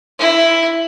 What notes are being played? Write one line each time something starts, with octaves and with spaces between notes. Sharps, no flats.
E4